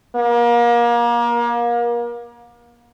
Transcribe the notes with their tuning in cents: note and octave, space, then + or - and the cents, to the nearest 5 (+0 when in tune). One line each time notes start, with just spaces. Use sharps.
A#3 +30